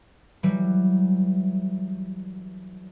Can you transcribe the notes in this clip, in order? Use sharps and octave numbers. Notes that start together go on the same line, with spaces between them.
E3 F#3 G3